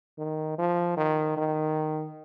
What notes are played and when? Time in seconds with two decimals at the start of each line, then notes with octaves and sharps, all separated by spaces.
0.18 D#3
0.58 F3
0.97 D#3
1.37 D#3